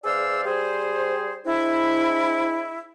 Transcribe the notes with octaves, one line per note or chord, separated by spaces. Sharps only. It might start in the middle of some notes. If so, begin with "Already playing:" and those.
E2 G#4 C5 D5 F5 E6
G3 G#4 C5
G#3 C4 D4 E4